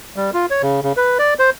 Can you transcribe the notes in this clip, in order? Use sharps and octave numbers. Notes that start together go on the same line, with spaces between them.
G3
F4
C#5
C#3
C#3
B4
D5
C5